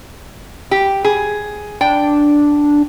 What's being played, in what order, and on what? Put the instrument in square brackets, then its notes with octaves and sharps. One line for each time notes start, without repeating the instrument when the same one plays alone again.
[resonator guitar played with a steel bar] G4
G#4
[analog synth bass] D4 [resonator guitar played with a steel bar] G5